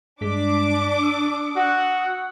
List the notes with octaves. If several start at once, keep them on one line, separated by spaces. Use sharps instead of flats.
G2 G#3 D4 D6 B6
D#6 E6
F#4 F#5